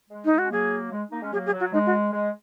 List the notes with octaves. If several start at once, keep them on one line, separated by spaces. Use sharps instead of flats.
G#3
D#4
G#3
F#4
C#4
F#3 A#3 G#4
G#3
A#3 D#4
G#3 C#4
F#3 A#3 G#4
G#4
F#3
F#4
G#3 D#4
F#4
G#3